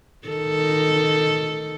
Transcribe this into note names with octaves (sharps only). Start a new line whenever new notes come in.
D#3 A4